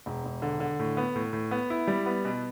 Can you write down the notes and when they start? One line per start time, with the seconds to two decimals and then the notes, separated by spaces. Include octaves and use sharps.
0.06 E1
0.25 E1
0.42 D3
0.60 D3
0.79 A2
0.97 B3
1.16 A2
1.33 A2
1.51 B3
1.70 E4
1.87 G3
2.06 B3
2.25 B2